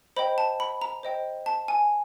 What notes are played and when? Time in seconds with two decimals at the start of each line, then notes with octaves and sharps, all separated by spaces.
0.16 C5 D#5 G5 B5
0.38 A5
0.60 B5
0.82 A#5
1.03 C5 D#5 G5
1.46 A5
1.68 G#5